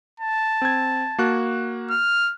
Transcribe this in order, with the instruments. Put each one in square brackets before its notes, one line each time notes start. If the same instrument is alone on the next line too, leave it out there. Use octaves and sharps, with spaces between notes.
[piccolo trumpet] A5
[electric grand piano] C4 G#6
A#3 F#4 F#6
[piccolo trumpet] F6